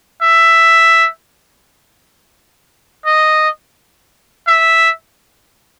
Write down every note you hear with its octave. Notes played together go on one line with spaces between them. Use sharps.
E5
D#5
E5